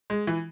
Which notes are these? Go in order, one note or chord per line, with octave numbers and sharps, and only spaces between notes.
G#3
E3